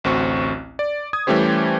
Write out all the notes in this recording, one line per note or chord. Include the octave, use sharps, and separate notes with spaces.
A1 D2 C4 F#4 C#6
D5
D#6 G#6
E3 G3 A3 C#4 G4 C5